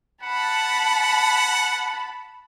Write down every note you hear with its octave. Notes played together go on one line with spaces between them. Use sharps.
F#5 A5 B5